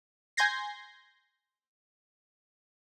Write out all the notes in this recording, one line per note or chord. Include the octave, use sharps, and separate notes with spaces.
G#5 C6 G6 G#6 A#6 C7